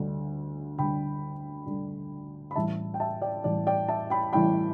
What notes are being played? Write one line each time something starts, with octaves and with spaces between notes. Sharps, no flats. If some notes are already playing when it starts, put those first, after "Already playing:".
Already playing: D2 D3 G3
D2 D3 G3 G5 B5
D2 D3 G3
B5
A1 A2 E3 G3 E5 A5
G5
E5 A5
D5 G5
A1 A2 E3 G3 D5
D5 G5
E5 A5
G5 B5
A1 A2 E3 G3 G5 B5